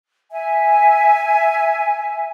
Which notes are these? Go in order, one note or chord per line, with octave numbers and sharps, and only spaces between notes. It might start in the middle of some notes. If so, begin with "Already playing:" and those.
E5 G#5